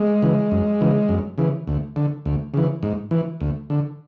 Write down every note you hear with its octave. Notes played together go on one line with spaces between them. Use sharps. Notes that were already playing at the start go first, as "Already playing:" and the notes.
Already playing: G#3
C#3 E3
F#2
C#3 E3
F#2
C#3 E3
D2
D3
D2
C#3 E3
G#2
E3
D2
D3